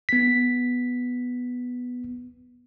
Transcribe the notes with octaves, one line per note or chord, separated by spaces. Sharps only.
B3 B6